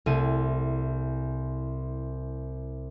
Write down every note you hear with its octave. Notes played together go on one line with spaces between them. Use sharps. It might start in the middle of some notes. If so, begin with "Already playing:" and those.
C2 A3 E4 D#7